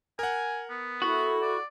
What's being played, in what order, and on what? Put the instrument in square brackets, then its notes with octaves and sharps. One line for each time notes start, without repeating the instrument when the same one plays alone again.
[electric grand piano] A#4 F#5 [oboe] G#5
[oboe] B3
[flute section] E4 A4 [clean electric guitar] F#4
[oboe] D5